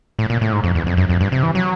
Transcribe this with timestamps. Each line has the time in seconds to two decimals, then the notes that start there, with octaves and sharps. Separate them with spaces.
0.19 A2
0.30 A#2
0.41 A2
0.52 G#2
0.64 F2
0.75 E2
0.87 F2
0.97 F#2
1.09 F2
1.21 G2
1.32 C3
1.43 E3
1.55 F#3